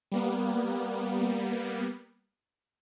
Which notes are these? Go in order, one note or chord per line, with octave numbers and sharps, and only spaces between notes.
G3 A#3 B3